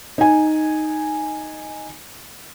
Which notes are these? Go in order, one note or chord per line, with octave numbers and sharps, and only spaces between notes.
D#4 G#5